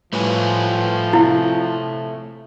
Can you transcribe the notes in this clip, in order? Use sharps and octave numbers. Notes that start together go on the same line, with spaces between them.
A2 F3 G3 A3 B4 C#5 G#5
C3 E4